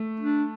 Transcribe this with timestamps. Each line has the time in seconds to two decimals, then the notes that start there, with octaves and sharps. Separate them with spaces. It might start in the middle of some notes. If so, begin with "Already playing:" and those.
Already playing: A3
0.20 D4